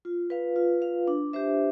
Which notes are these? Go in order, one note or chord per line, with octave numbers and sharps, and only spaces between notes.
F4
B4 F5
F4
B4 F5
D4
G4 C5 E5